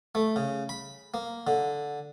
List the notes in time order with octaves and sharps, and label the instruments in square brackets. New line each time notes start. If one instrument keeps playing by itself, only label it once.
[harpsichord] A3
C#3
B5
A#3
D3